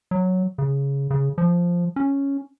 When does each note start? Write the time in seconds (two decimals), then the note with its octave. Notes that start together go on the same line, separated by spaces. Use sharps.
0.11 F#3
0.58 C#3
1.10 C#3
1.38 F3
1.96 C#4